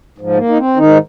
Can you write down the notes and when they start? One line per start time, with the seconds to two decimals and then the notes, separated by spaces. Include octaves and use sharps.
0.18 G#2 F3
0.37 A#3
0.49 D#4
0.58 C4
0.77 G#2 D#3 D#4